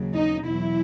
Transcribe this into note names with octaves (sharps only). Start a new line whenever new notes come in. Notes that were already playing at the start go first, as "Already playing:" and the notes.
Already playing: D#2 C#3 F#3
D#4
E2 B2 F#3 E4